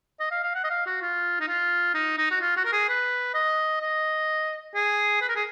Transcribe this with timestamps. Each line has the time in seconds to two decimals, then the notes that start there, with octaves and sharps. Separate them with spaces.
0.20 D#5
0.31 F5
0.43 F5
0.55 F#5
0.64 D#5
0.70 F5
0.86 F#4
1.02 F4
1.40 D#4
1.48 F4
1.94 D#4
2.18 D#4
2.31 F#4
2.41 F4
2.57 F#4
2.65 A#4
2.73 G#4
2.89 B4
3.34 D#5
3.81 D#5
4.75 G#4
5.21 B4
5.29 A#4
5.36 G#4